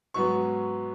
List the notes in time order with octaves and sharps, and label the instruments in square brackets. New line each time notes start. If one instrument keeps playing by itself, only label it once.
[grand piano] G#2 F#3 B3 C#6